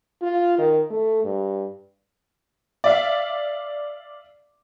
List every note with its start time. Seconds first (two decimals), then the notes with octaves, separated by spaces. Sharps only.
0.22 F4
0.58 D#3
0.90 A3
1.24 G2
2.84 D5 E5 F5